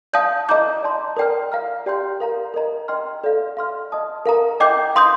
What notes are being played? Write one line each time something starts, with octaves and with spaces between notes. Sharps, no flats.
D5 F5 A5 D#6 G6
D#5 A#5 D6 G6
D5 A5 C6
A#4 D5 G5 A#5 F6
F5 A#5 F6
G4 D5 G5 C6 G6
A#4 F5 A#5
A#4 D#5 A#5
D#5 G5 C6 F6
A4 D5 F5
F5 C6 F6
D#5 A5 D#6
A#4 F5 A#5 D#6
D#5 G5 D6 G6
F5 C6 D#6 G6